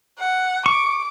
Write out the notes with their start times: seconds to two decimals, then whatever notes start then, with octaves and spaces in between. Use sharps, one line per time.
0.19 F#5
0.66 C#6 D6